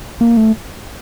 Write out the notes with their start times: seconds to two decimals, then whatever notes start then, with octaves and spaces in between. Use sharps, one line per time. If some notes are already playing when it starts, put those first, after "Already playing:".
0.21 A#3
0.37 A3